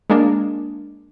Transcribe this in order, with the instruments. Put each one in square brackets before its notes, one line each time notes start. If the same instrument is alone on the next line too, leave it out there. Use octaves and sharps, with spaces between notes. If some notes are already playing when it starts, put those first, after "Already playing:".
[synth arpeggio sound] G#3 A#3 D4